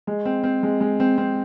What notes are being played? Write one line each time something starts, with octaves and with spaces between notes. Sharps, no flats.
G#3
C4
C4
G#3
G#3
C4
C4